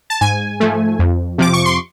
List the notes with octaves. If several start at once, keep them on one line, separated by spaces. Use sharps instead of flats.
A5
G#2 G#5
F3 A3
F2
C3 F3 D6
C#6
C6